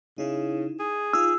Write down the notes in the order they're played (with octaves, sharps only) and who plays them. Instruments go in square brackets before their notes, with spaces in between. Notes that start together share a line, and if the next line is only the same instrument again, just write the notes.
[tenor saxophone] C#3 [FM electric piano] D#4 E4
[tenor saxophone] G#4
[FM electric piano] D#4 F4 [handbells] E6